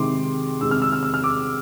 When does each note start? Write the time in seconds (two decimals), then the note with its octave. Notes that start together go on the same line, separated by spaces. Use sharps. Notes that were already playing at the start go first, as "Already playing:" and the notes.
Already playing: C3 D#3 G#3 C6 D6
0.61 C3 D#3 G#3 E6
0.71 F6
0.82 E6
0.92 F6
1.03 E6
1.14 F6
1.24 D6 E6